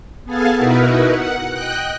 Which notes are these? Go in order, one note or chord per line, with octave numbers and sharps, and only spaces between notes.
B3 G#4 A4 F5 G#5 A5
B2 D#4 E4 F#4 A#4 B4
F#5
D#5 G5 F#6